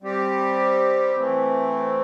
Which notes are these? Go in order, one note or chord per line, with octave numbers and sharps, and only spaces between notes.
G3 C4 G4
E3 A3 C4